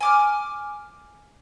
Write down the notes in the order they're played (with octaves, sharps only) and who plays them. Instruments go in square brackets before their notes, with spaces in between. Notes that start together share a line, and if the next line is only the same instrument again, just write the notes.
[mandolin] G#5 D6 F6